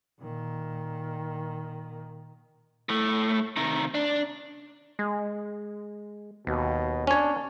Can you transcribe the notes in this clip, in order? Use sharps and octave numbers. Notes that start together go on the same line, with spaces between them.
A#2 D#3
A2 A3
C3 D#3
D4
G#3
D#2 B2
C#4 D4 C#5